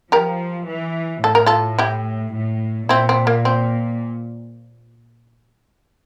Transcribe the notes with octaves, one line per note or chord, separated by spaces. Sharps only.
F3 G4 A#4
E3
A2 A4
A#4
F4 A4
E4 G4
A2
A#2 C4 E4
C4
A#3
C4